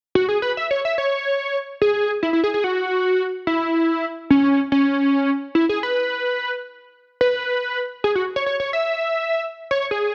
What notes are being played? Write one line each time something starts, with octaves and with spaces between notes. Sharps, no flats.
F#4
G#4
B4
E5
C#5
E5
C#5
G#4
E4
E4
G#4
G#4
F#4
E4
C#4
C#4
E4
G#4
B4
B4
G#4
F#4
C#5
C#5
C#5
E5
C#5
G#4